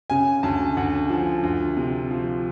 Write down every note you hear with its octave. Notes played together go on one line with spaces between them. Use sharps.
C#3 G#5
D2 A5
D2 F#5
F3
D2
C3
F3